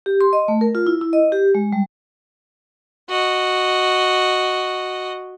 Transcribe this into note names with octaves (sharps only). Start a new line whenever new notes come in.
G4
C6
D#5
A3
A#4
F4
E4
E4
D#5
G4
G#3
G3
F#4 D#5